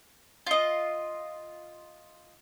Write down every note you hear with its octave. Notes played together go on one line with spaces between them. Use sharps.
F4 D#5